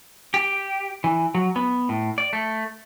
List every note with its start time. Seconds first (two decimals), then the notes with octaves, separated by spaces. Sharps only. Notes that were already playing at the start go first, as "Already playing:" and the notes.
0.34 G4
1.04 E3
1.35 F#3
1.56 B3
1.89 A2
2.18 D5
2.33 A3